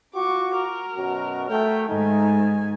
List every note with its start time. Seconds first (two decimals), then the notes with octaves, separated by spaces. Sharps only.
0.15 F4 F#4 C#6 D6
0.55 A#4
0.97 F#2 B2 F#4
1.49 A3 A#4 G5
1.88 G#2 D#3 A3 D#4 G#5